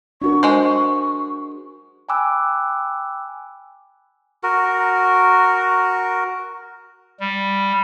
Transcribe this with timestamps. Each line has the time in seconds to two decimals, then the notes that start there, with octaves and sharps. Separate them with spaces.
0.22 D4 F#4 A#4 C#6
0.43 G#3 C5
2.09 G5 G#5 B5 D6 E6 F#6
4.43 F#4 A#4
7.20 G3